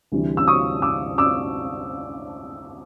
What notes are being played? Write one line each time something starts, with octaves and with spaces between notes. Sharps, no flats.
D2 C3 E3 G3
E6
C#6 D#6
D6 E6
D6 E6